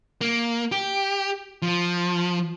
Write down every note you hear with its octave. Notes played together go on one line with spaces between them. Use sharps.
A#3
G4
F3